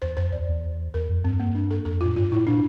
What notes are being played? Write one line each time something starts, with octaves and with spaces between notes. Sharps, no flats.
E2 C5
F2 C5
E2 D5
E2
E2 A#4
F2
G2 C4
A#3
D4
A4
F2 A4
F4
A2
G2 F4
A2 E4
A#2 D4